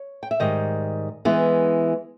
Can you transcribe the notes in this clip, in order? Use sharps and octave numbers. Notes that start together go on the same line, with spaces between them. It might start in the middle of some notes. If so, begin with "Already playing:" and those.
Already playing: C#5
G5
E5
G#2 D#3 G3 D#5
E3 G#3 B3 E4